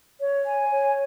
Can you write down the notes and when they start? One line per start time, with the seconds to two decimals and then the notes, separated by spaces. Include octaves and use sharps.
0.19 C#5
0.46 G#5
0.71 C#5